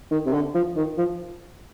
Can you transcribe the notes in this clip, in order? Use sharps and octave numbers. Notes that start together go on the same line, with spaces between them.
D#3
C3
D3
F3
D#3
F3